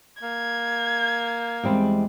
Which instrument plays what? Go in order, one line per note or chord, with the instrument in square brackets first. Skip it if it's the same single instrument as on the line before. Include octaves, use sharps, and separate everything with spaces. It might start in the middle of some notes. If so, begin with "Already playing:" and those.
[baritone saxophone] A#3 [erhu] G#6
[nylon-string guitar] E2 G3 C4 [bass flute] G#3